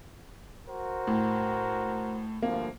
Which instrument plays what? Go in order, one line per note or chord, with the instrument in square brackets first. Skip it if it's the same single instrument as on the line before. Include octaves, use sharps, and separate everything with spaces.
[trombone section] F#4 A#4 C5
[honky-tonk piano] A2
[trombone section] D2 G2 F3 [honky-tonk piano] A#3